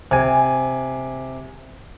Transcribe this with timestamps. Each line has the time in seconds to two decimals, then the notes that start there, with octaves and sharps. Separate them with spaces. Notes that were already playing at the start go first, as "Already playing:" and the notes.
0.11 C3 G#5